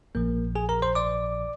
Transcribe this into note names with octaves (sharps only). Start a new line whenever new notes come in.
A#1 A#2 F3 A#3 A#4
G#4 G#5
A#4 A#5
C5 C6
D5 D6